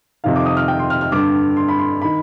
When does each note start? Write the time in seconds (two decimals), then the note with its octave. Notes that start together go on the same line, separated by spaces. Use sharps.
0.24 F2 C3 D#3 F5
0.36 D6
0.46 D#6
0.57 F6
0.68 G5
0.79 C6
0.90 F6
1.01 F6
1.12 G2 D3 D6
1.57 C6
1.68 B5
1.79 C6
2.02 D#3 B5